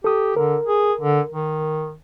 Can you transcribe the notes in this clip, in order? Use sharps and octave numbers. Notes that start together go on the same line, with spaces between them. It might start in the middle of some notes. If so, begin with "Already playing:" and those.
G4 A4 D#6
D3 A#4
G#4
D3
D#3